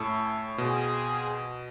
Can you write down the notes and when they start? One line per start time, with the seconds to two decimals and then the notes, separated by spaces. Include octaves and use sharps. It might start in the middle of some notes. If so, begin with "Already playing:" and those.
Already playing: A2 C#4 E4 A4
0.58 B2 C4 F4 G#4